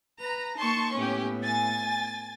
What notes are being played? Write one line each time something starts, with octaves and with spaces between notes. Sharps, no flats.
B4 A#5
A#3 D#4 A5 C6 C#6
A2 B3 C#4 G4
G#5 A6